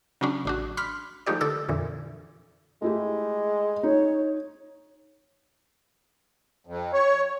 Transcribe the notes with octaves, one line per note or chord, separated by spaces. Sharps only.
C#3 F#3 C#4 D4
A1 D4 F#4
B5 C6 D6 F6 B6
F3 G#3 A3 D#4 G4 D5
D3 A4 D6 E6
F2 A#2 D3 E3
G#3 A3 E4 G4
D#4 C#5
F2
C#5